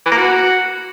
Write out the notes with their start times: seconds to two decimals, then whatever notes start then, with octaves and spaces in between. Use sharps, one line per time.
0.06 E3
0.11 A#3
0.17 F#4